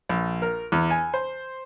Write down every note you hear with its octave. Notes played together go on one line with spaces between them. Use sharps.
A#1
A#4
E2
G#5
C5